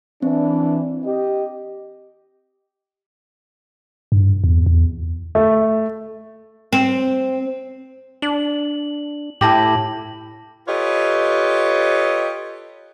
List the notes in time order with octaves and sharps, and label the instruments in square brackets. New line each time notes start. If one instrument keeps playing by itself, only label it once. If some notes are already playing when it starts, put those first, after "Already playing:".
[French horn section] E3 D4 [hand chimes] C4
[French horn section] G4 D#5
[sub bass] G2
E2
E2
[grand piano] A3
[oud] C4
[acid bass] D4 [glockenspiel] F#7
[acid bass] A2 [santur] E4 G4 [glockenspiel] A5 A#6 F#7
[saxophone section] F4 G4 A4 B4 C#5 D#5